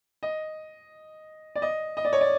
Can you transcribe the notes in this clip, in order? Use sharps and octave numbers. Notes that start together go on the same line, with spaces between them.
D#5
D5
D#5
D#5
D5
C#5
D5